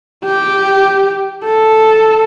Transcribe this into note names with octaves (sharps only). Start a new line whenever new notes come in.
G4
A4